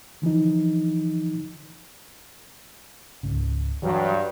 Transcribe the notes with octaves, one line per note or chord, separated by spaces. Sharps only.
D3 E3 F3 D#4
C#2 G#2 C#3
G2 E3 F#3 G3